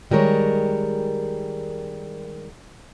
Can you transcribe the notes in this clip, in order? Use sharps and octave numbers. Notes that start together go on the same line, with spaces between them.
D#3 G3 G#3 A#4 C#5